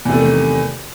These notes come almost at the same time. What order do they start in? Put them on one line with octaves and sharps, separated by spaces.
E2 C3 A3 D#3